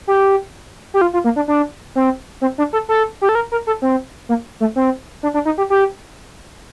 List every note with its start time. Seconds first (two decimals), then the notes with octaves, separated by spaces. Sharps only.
0.07 G4
0.94 G4
1.01 F4
1.13 F4
1.24 A#3
1.36 D4
1.48 D4
1.95 C4
2.41 C4
2.58 D4
2.73 A4
2.89 A4
3.21 G4
3.29 A4
3.35 A#4
3.52 A#4
3.67 A4
3.82 C4
4.29 A#3
4.60 A3
4.76 C4
5.23 D4
5.34 D4
5.45 D#4
5.58 G4
5.70 G4